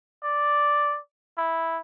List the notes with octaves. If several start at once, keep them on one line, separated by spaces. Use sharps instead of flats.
D5
E4